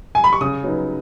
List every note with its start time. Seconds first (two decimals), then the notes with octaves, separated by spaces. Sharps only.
0.15 G#5
0.24 B5
0.33 C#6
0.41 C#3 D#6
0.64 F#3 B3 D#4